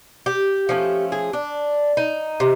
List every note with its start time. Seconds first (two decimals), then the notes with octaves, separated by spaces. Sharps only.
0.26 G4
0.69 F3 A3 C#4
1.12 G#4
1.33 D4
1.97 D#4
2.40 C3